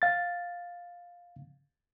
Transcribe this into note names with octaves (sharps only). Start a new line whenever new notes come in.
F5 A6